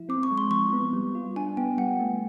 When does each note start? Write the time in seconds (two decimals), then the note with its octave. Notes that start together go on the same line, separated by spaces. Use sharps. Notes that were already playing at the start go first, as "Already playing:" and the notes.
Already playing: F3 E4
0.09 C4 D6
0.23 C#6
0.31 G#3
0.38 C6
0.51 F3 C#6
0.73 B3
0.93 G3
1.15 F4
1.36 D4 G#5
1.57 B3 G5
1.78 G3 F#5
2.00 A3